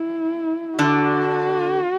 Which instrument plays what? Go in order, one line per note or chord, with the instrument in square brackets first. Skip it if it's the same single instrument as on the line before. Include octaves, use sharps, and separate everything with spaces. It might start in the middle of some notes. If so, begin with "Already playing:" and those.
Already playing: [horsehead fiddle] E4
[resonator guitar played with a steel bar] D3 D4 [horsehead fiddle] F#4